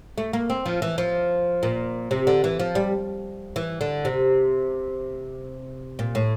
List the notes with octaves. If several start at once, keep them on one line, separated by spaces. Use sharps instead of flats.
A3
A#3
C4
F3
E3
F3
A#2
C3
D3
E3
F3
G3
E3
D3
C3
A#2
A2